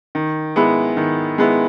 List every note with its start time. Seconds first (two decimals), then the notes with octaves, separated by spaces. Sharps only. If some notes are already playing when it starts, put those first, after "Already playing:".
0.15 D#3
0.56 G#3 B3 E4
0.97 D#3
1.38 G#3 B3 E4